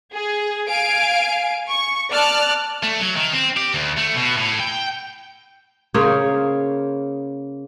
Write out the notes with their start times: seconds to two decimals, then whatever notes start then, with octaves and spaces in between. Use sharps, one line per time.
0.12 G#4
0.67 F5 G#5 D7
1.69 C#6
2.10 D5 A5 F6 F#6
2.83 A3
3.00 F#3
3.16 D#3
3.33 C4
3.57 G4
3.74 D2
3.98 A3
4.15 B2
4.37 A2
4.60 G5
5.94 C#3 A#3 C5 C#5